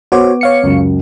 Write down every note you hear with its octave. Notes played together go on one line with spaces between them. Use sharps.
B3 F#4 C5 C#5 D6
C#5 F5 C#7
C#2 F#2